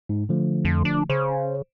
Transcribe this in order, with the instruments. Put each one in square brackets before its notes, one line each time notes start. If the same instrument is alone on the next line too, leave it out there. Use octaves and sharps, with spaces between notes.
[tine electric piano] G#2
D3 F3 A3
[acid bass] F2
D4
[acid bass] C#3 [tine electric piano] C5